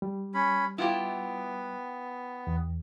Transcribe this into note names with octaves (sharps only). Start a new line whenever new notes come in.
G3
C#4 B5
B3 E4 F4 G4
E2